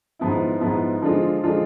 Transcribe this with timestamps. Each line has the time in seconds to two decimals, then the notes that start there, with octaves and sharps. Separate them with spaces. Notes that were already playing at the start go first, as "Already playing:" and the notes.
0.19 G#2 F3 B3 E4
0.60 G#2 F3 B3 E4
1.02 D3 F3 G#3 D4 F4
1.44 D3 F3 G#3 D4 F4